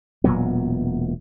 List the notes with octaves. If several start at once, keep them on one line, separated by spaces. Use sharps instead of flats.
E1 A#2 F#3 B3